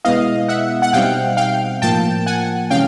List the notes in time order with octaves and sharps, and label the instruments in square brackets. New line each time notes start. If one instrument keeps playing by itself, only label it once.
[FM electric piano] B2 G#3 B3 E4 [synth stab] D#5 F5
[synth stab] E5 F#5
F#5
[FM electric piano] B2 G3 C4 D#4 [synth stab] F5 G5
[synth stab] F5 G5
[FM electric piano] A2 F3 A#3 [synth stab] G5 A5
[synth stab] F#5 G#5
[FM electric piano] C3 E3 G#3 C#4 [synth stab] F5 G5